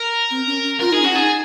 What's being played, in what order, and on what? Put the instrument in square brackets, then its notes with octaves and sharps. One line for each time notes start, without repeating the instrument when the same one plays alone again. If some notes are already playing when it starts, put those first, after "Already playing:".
Already playing: [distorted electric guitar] A#4
[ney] C4
C#4
C#4
[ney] F4 [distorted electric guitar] A#4
[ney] D#4 [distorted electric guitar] G#4
[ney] C#4 [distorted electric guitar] F#4
[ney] D#4 [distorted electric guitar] G#4